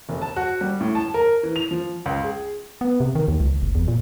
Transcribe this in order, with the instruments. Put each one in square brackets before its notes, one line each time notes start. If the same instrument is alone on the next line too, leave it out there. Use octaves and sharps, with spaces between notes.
[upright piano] F1
A5
F#4
G3
A2
A5
A#4
E3
F7
F3
C#2
G#4
[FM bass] B3
C3
D#3
D#2
C#2
F#1
E2
A#2